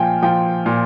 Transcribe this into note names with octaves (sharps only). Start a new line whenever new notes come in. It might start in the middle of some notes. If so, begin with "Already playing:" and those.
Already playing: A#2 F3 G5 G#5
F3 G5
A#2